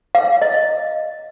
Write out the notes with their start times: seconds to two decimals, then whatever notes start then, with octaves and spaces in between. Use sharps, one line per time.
0.15 F5
0.42 D#5